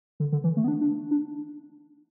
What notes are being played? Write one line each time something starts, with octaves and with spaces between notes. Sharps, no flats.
D3
D3
E3
A3
B3
D4
D4
D4